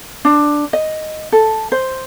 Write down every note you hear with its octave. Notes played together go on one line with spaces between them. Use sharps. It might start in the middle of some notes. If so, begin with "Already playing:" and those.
D4
D#5
A4
C5